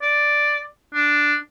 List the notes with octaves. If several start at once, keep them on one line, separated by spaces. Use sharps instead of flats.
D5
D4